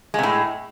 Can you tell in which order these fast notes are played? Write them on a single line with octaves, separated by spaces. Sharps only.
G#3 C3 A2